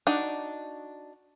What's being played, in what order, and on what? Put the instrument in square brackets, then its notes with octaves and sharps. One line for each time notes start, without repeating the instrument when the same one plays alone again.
[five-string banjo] D4 D#4 F#4 D5